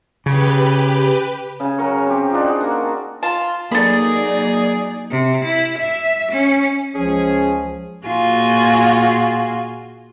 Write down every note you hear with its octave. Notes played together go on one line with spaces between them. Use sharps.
C#3 G4 B4 B5
C#3 G#5
F#3 A#4 C#5
C4 G4
D4 D#4 F4
F#4 G#4
A#3
F4 A5
F#3 A#3 D#4 G#4 A4 D5 B5
C3
E4
E5
C#4
C#2 F3 C#4 G#4
A#2 F4 F#4 G#4 G#5